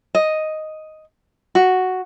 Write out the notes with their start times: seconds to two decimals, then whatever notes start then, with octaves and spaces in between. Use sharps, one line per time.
0.15 D#5
1.55 F#4